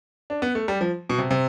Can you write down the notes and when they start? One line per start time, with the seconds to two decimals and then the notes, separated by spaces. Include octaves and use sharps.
0.30 D4
0.42 B3
0.55 A3
0.68 G3
0.81 F3
1.10 B2
1.18 C3
1.31 C3